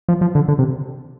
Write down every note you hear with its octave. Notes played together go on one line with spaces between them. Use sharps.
F3
F3
D3
D3
C3